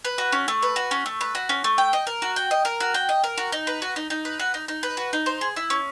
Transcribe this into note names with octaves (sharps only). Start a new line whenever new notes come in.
B4
F#4
C#4
A3
B4
F#4
C#4
A3
B4
F#4
C#4
A3
G5
D#5
A#4
F#4
G5
D#5
A#4
F#4
G5
D#5
A#4
F#4
D#4
B4
F#4
D#4
D#4
B4
F#4
D#4
D#4
B4
F#4
D#4
C5
G#4
E4
C#4